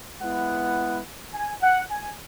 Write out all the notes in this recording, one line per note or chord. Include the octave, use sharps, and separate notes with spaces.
G#3 B3 E4 F#5
G#5
F#5
G#5